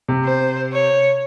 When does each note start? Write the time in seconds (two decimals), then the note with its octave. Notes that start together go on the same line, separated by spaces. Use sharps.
0.08 C3
0.24 C5
0.73 C#5